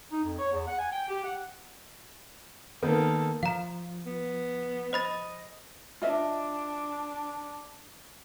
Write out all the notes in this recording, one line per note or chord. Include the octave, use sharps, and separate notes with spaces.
D#4
F2
C#5
E2
F#5
G#5
G5
G4
F#5
D#3 A#3 B3 A4
F3 F5 A#5
B3
C5 D#5 B5 A6
D4 F4 D#5 E5